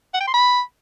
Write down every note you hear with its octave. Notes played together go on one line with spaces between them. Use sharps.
F#5
G5
C6
B5